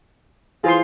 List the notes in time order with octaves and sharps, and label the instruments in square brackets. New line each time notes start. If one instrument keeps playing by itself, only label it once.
[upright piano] E3 [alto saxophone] F4 [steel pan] G#4 C5 C6